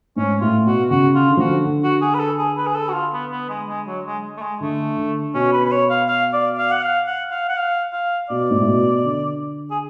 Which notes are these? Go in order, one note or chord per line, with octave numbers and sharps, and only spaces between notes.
G#2 C#4
A2 F4
B2 F#4
C#3 F#4
F4
D3
F3 F#4
D3
D3
F#4
G#4
B4
A4
G#4
B4
G#4
A4
F#4
F4
B3
B3
G#3
G#3
F#3
G#3
A3
G#3
D3 A3
D3
B2 C#4
B4
B4
C#5
F5
F5
D5
F5
F#5
F5
F#5
F5
F#5
F5
F5
B2 D5
G#2
A2
B2
D3
G#4